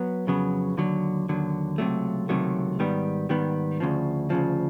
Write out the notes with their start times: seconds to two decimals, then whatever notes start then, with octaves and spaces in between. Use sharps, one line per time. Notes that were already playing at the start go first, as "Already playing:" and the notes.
Already playing: F#3 B3
0.27 F2 C#3 F#3 B3
0.77 D#2 D3 F#3
1.29 D#2 D3 F#3
1.78 C#2 C3 D#3 F#3 A3
2.29 C#2 C3 D#3 F#3 A3
2.79 G#2 D#3 G3 B3
3.29 G#2 D#3 G3 B3
3.80 D2 C#3 F3
4.30 D2 C#3 F3